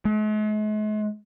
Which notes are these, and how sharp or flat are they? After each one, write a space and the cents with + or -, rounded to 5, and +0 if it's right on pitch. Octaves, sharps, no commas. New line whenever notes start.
G#3 +45